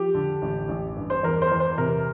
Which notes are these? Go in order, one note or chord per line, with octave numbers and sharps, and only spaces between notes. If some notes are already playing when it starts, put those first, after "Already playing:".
Already playing: F3 G4
D3
A1
A1
G2
C5
E2 A#4
C5
E2
C5
C3 A#4